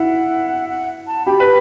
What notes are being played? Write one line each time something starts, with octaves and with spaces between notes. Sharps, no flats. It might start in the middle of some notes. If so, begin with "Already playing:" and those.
Already playing: E4 F#5
F#5
A5
G4 B5
B4